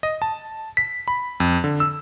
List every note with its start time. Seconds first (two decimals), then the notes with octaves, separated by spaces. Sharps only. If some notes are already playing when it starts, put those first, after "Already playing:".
0.03 D#5
0.22 A5
0.77 B6
1.08 B5
1.40 F2
1.64 D3
1.80 E6